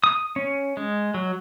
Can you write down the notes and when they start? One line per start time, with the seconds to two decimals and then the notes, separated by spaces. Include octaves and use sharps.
0.04 D#6
0.36 C#4
0.77 G#3
1.14 F#3